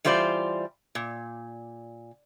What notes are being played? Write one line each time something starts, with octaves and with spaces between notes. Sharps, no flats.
E3 G3 F4 C5 D5
A#2